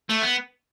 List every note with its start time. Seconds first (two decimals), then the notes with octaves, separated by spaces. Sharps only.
0.10 A3
0.23 B3